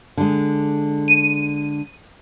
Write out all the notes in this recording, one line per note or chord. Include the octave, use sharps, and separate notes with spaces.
D3 G#3
D#7